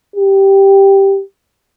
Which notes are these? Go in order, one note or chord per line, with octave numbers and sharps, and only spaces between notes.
G4